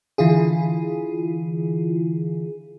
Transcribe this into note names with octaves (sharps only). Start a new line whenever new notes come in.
D3 E3 E4 F4 G#4